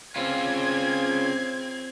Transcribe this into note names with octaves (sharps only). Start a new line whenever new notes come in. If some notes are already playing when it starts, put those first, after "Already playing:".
C#3 C4 F4 G#6